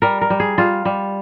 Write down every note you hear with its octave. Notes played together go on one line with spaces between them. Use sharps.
G3 A#4
A#4
G3
G#4
G3 F4
G3